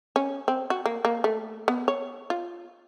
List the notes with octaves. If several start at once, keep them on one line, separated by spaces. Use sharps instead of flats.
C#4
C4
F#4
A#3
A#3
A3
B3
C#5
F4